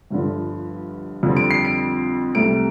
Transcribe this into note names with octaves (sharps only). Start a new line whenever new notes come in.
G1 G2 D3 F3
F2 D3 G3 C4
D7
C7
D7
C2 C3 A3 D7